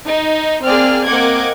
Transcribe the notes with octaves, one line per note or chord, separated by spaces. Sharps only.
D#4
A#3 C4 G#4 D5 F6
A#3 C4 D#5 F#5 D6 G#6